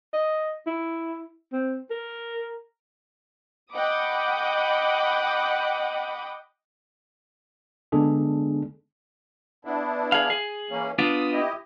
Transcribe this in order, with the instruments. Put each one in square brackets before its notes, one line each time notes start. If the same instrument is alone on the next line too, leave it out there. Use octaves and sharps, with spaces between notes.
[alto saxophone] D#5
E4
C4
A#4
[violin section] D#5 F#5 G5 B5 D6 D#6
[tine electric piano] D3 G#3 B3 D4 G#4 A4
[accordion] B3 D4 E4
[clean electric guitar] G#4 F5
G#4
[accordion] E3 A#3 C#4
[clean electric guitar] B3 D4 F4 [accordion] D#6
[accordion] E4 G4 D#5